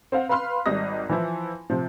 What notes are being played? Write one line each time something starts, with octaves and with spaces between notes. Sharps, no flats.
C4 C5 F5 F#5
B4 F5 B5 C6 F6
G#1 G3 D#5 D#6 A#6
E3 F3 E4
C3 F3